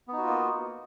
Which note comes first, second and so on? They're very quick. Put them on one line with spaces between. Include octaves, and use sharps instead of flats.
B3 D#4 F#4 F4 A#3